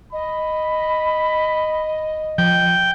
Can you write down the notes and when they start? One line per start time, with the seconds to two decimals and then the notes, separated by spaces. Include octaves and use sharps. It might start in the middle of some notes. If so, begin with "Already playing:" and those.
0.13 D#5 B5
2.38 F3 G5